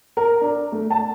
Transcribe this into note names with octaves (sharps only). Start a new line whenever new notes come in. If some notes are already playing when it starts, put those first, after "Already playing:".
A#4
D4
A3
A5